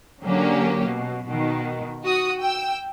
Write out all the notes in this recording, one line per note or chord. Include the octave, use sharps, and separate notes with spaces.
D3 F#3 A#3 C#4 G4
B2
B2 D#3
F#4 D#6
G5 E6